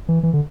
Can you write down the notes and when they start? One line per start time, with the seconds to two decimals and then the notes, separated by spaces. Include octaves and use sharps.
0.09 E3
0.23 E3
0.33 D3